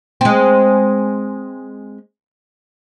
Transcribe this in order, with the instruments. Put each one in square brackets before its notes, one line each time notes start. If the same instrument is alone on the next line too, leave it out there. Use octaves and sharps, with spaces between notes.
[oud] G#3 C4